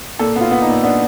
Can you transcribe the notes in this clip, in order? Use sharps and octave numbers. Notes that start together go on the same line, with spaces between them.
A#2 A4
B3 F4
B3
D#4
A#2
B3 D4